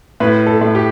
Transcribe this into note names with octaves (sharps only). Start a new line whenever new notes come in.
A2 B4
A4
A2
G4